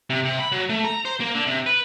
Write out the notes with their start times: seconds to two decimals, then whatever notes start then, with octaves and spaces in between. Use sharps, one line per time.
0.10 C3
0.25 C3
0.40 B5
0.52 F#3
0.69 A3
0.85 A#5
1.05 C5
1.20 A#3
1.35 D3
1.47 C3
1.66 B4